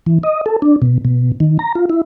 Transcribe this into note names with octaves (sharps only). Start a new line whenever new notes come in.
E3
D#5
A4
D4
B2
B2
D#3
A#5
F4
E4